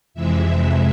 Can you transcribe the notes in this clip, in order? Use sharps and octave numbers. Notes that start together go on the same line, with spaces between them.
F2 C3 E3 G#3 E5